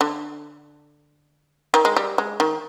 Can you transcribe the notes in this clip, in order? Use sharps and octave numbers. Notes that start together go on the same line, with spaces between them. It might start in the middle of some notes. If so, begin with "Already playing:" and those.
D3
D#3
G#3
G3
G#3
D#3